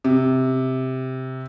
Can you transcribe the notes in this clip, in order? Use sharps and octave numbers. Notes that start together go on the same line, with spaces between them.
C3